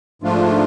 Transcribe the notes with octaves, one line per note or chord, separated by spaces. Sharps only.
G#2 F3 A3 D4 F4